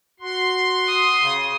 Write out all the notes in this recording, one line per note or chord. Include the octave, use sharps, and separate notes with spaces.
F#4 C6
D#6
C#3